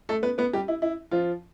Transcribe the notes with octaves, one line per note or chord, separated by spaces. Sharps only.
A3 A4
B3 B4
B3 B4
G3 G4
E4
E4
F3 F4